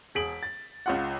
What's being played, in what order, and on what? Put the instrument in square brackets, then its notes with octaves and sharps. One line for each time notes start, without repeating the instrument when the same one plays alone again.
[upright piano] E1 G#4 B6 D7 F#7
A6
C#2 F4 F#5